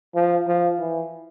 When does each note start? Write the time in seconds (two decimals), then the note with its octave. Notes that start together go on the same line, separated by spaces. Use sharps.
0.14 F3
0.47 F3
0.80 E3